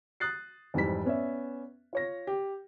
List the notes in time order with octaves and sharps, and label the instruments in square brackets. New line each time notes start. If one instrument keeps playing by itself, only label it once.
[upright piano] D#6 F#6 A6 C7
F2 G#2 E3 G3 E4 B6
B3 C#4 D5 E5
F4 C#5 A#6
G4